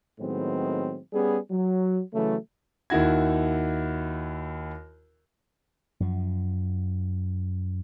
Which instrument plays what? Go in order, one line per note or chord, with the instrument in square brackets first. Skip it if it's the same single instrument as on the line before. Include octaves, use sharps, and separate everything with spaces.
[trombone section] A2 D#3 F#3 G#3 B3 C4
G3 B3 C#4 G#4
F#3
C#3 E3 F#3 A3
[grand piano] D#2 D#3 E4 F#4 G#6
[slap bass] F#2 F3